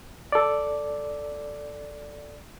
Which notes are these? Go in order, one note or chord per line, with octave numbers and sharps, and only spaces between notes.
A4 D5